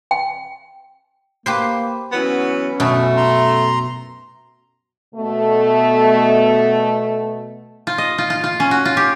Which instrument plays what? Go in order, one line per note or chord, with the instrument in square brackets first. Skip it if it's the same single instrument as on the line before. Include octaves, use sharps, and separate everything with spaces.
[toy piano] G5
[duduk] A#3 [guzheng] G4 B4 C5
[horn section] E3 F#3 B3 [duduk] C#4
[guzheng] F#2 B2 B4 [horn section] A3
[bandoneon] A#5 C6
[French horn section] B2 A3
[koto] F4
D#5
F4
F4
F4
C#4
F#4
F4
G4